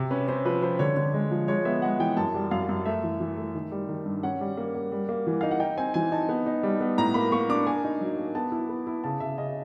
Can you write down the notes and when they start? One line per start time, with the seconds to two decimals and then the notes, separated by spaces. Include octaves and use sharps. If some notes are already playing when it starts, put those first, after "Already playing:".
Already playing: C3
0.11 C#4 B4
0.28 C#4 C5
0.45 F3 B4
0.62 F3 C5
0.79 D3 C#5
0.97 D3
1.14 G#3
1.31 F3
1.48 G#3 C#5
1.65 B3 E5
1.82 G#3 F#5
1.99 E3 G5
2.17 F#2 A5
2.34 G3
2.51 F#2 F5
2.69 F#2
2.86 A3 E5
3.03 E3
3.20 E3
3.37 A3
3.55 D#3
3.72 G3
3.89 D#3
4.05 G2
4.23 C#4 F#5
4.41 G3
4.57 A#3
4.75 A#3
4.92 G3
5.09 A#3
5.27 E3
5.41 D#4 F5
5.51 F#5
5.60 D#4 G5
5.77 C4 G#5
5.94 E3 G#5
6.12 D#4 A5
6.29 B3
6.46 D#4
6.63 G3
6.81 B3
6.98 A2 A#5
7.14 A#3 B5
7.32 A#3 C#6
7.49 D4 D6
7.67 A#3 G#5
7.84 D#4
8.01 F#3
8.18 A#3
8.35 B3 A5
8.52 E4
8.69 B3
8.87 E4
9.04 C#3 A5
9.20 C#3 E5
9.38 C#3 D#5